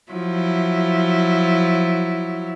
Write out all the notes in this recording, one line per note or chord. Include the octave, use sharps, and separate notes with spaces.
F3 F#3 E4